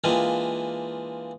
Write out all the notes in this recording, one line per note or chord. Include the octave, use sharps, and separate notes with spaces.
E3 G#3 A#3 C4 D4 F4